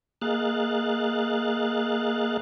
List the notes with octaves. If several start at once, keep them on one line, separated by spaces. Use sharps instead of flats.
A#3 G#4 D#5 F5 F#6 A6